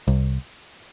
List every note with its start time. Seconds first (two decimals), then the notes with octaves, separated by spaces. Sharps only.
0.08 C2